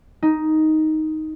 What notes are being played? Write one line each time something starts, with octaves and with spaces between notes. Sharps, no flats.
D#4